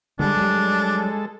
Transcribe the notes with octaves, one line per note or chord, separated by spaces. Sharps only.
D3 G3 G#3 D4 A4
F#3 G3